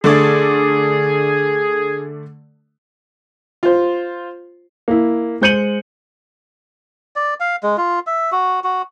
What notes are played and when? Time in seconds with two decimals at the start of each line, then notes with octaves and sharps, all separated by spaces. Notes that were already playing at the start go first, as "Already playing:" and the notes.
0.04 D3 A3 G#4 D5
3.63 F4 C5
4.88 A#3 E4
5.41 G#3 C5 G6 C#7 D#7 F#7
7.16 D5
7.40 F5
7.63 G#3
7.78 F4
8.07 E5
8.32 F#4
8.64 F#4